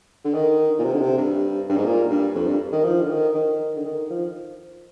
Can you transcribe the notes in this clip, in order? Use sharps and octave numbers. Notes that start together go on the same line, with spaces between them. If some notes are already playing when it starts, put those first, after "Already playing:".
D3
D#3
A#2
C3
D3
C3
G2
G2
G#2
A#2
G2
F2
G2
D#3
F3
D3
D#3
D#3
D3
D#3
F3